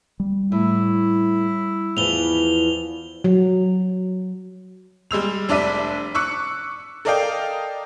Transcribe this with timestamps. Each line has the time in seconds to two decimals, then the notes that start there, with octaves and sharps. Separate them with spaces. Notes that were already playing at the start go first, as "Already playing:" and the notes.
0.20 G3
0.52 A2 E4
1.97 E2 E3 F3 F7 G7
3.24 F#3
5.11 G3 G#3 E6 F7
5.49 F1 D4 D5 E5 B6 D#7
6.15 C#6 D6 E6 F#6 C#7
7.05 A4 A#4 D5 D#5 F5 G5